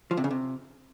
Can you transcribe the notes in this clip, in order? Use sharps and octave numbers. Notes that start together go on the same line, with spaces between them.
F3
C3
C#3
C3